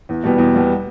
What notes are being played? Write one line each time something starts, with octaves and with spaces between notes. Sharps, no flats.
E2
B2 G3 B3
E2
B2 G3 B3